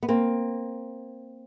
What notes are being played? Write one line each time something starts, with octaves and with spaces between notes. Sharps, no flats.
B3
A#3 C4